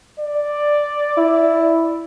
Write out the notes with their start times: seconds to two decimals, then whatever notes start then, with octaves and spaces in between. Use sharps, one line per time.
0.20 D5
1.17 E4